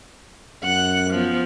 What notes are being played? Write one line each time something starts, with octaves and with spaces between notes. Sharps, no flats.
F#2 F#5 F#6
F3 B3